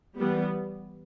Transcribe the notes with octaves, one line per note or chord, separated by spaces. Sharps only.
E3 G3 B3